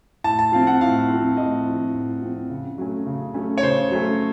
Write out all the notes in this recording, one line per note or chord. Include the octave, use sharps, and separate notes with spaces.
A2 A5
A5
F3 C4 F5
F#5
A2 F5
F3 C4
A2 D#5
F3 C4
A2
F3 C4
C#3
F#3 A3 C#4
C#3
F#3 A3 C#4
C#5
C#3 C5
F#3 A3 C#4